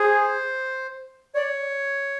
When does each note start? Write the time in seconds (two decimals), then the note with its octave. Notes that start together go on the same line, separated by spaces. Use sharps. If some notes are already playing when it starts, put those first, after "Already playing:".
Already playing: G#4 C5
1.34 C#5 D5